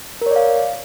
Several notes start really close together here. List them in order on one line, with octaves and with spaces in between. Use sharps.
A#4 C#5 D5 F5